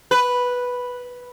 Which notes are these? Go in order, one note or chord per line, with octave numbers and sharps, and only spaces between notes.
B4